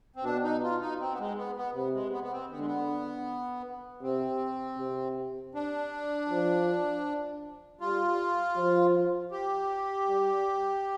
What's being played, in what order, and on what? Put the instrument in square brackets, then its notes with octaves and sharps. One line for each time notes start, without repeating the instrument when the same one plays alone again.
[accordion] C4
[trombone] B2 [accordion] D4
[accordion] D#4
F4
D#4
C4
B3
G#3
B3
B3
[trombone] C3 [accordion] B3
[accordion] G#3
B3
B3
C4
[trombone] D3 [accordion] B3
[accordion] G#3
B3
[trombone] C3 [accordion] C4
[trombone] C3
[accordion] D4
[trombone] F3
[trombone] G3 [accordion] F4
[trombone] F3
[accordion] G4
[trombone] G3